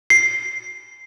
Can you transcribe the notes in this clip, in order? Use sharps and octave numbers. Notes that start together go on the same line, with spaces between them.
C7